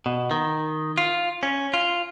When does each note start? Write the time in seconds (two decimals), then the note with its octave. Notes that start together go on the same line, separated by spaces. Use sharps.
0.06 B2
0.31 D#3
0.98 F4
1.43 C#4
1.74 F4